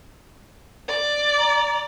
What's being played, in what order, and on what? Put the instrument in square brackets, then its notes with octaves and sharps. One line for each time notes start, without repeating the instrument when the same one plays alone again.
[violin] D5
[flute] A#5